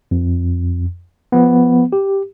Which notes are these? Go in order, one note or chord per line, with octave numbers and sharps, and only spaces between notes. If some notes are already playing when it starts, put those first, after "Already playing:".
F2
F3 B3
G4